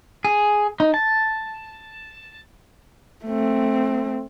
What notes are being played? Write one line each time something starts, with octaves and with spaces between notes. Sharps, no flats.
G#4
D#4
A5
A3 C4